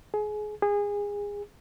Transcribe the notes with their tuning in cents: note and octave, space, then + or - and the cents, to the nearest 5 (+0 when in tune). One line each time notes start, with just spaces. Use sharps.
G#4 +25
G#4 -25